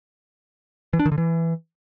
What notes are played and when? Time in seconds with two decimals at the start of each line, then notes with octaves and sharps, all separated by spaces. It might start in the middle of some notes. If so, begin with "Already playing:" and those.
0.93 E3
0.99 D4
1.06 D#3
1.12 D3
1.18 E3